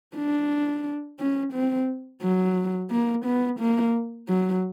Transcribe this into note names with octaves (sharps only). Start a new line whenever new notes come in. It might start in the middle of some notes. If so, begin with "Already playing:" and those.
D4
C#4
C4
F#3
A#3
B3
A#3
F#3